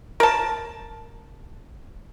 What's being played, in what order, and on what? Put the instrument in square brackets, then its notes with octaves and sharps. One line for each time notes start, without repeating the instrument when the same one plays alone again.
[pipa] A#4 A5